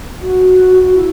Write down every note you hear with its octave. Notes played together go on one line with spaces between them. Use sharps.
F#4
E4